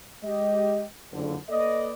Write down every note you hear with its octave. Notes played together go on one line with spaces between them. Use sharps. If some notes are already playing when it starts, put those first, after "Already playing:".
G#3 G4 D#5
F#1 F2 D3
A#3 A4 B4 D5 D#5